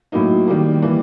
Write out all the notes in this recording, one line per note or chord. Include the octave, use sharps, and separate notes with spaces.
A2 F#3 A#3 D#4
D#3 G3 A#3 D#4
E3 G3 A#3